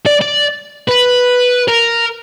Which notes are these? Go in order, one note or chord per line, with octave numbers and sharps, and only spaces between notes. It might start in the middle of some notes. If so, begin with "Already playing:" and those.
D5
D5
B4
A#4